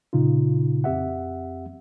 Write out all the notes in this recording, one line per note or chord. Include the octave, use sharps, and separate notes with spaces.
A#2 C#3 D#4 F4
F2 C4 G4 E5 F#5